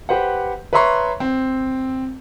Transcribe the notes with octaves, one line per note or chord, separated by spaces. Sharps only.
G4 B4 C5 F#5
B4 C#5 E5 A#5 C6 C#6
C4